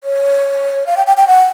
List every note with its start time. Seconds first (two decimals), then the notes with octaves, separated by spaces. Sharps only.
0.04 C#5
0.86 F5
0.97 G5
1.07 G5
1.17 G5
1.27 F#5